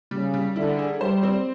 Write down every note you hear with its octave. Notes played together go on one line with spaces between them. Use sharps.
C#3 G3
G3
D3 E4
G#4
G3 C5
C4